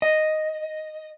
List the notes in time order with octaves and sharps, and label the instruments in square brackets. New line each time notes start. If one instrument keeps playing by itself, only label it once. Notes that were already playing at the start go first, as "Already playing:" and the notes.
[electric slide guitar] D#5